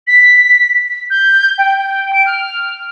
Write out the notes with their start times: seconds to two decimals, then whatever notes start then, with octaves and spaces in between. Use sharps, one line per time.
0.07 B6
1.10 G6
1.58 G5
2.13 D7
2.26 F6